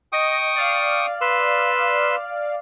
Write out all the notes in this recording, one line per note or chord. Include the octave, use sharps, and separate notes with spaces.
D#5 G5 C#6 D#6
D5 F5
B4 C6 E6